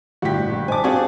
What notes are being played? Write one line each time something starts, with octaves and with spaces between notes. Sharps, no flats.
G1 A2 F#4 G4 B6
A#1
G#2 C5 G#5 A5 D6
C4 D4 F#4 G#4 C5 F5 G5 C#6